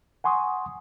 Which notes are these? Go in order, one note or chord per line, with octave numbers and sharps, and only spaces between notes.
F#5 G#5 C6 C#6 D#6